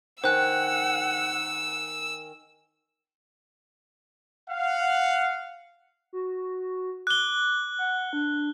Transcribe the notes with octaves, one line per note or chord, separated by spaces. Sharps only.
D#3 C5 F#5 G#5 E6 F#6
F5 F#5
F#4
D6 F#6 G7
F#5
D4